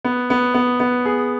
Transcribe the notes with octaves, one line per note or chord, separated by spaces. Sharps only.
B3
B3
B3
B3
G#4